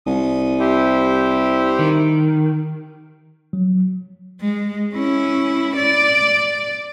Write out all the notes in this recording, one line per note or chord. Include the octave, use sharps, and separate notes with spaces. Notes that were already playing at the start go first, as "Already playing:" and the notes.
C2 D#6
E4 G4 C5
D#3
F#3
G#3
C#4 E4
D5